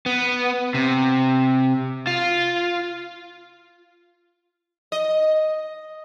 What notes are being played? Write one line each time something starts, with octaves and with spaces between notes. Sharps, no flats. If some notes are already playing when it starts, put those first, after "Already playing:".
B3
C3
F4
D#5